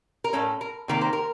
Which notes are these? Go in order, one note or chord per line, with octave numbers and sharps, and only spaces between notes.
A#4
A2 A3 C#4 A4
A#4
C3 D#3 A#3 A#4
C5
A#4